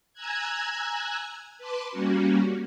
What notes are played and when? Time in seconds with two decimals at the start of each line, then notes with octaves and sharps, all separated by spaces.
0.13 G#5 A#5 E6 F#6 G#6
1.58 B4 A5 C6 D6
1.91 G3 A#3 C#4 F#4